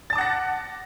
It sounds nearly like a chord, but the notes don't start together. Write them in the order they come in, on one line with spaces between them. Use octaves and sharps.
A6 A5 D6 F#5 A#6